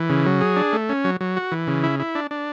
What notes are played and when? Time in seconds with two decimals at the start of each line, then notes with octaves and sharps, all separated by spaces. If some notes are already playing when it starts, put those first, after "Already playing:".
Already playing: E3
0.09 C#3
0.26 F#3
0.41 G#4
0.56 D4
0.73 A3
0.89 C#4
1.04 F#3
1.21 F#3
1.36 F#4
1.52 E3
1.67 C#3
1.83 E4
2.00 E4
2.15 D4
2.31 D4